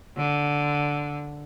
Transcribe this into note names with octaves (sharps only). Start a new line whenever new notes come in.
D3